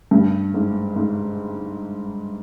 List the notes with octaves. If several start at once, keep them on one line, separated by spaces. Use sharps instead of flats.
G2
G#2
G#2